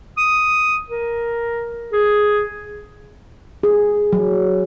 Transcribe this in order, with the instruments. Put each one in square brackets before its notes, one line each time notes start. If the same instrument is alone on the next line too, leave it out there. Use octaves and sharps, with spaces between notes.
[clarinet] D#6
A#4
G#4
[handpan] G#4
F#3